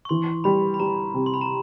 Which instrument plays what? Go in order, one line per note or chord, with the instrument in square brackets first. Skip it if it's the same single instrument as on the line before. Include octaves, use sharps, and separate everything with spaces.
[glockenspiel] C#6
[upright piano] E3 [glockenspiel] C6
[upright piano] G3 [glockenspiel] B5
[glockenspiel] B5
[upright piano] G3 [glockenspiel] A#5
[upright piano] C3
[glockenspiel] C6
B5
A#5